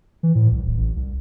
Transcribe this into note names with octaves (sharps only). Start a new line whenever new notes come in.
E3
A2
C2
D1
A1
C2